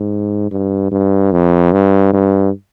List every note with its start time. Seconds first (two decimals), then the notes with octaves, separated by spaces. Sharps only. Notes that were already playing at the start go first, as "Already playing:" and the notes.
Already playing: G#2
0.51 G2
0.92 G2
1.32 F2
1.73 G2
2.13 G2